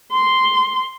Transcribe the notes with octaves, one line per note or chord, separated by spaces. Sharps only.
C6